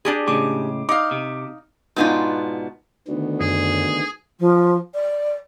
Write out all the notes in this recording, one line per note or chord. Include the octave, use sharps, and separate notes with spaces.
D4 G4 G#4
A2 C#3 G#3 D6
D#4 F5 D6
C3
G#2 B2 B3 D4 D#4 F4
D2 D3 D#3 B3
F#2 G#4
F3
D5